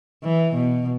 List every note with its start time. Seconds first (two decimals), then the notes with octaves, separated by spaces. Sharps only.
0.23 E3
0.54 B2